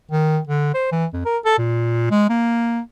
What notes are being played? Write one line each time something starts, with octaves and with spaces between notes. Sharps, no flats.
D#3
D3
C5
E3
F2
A#4
A4
A#2
G#3
A#3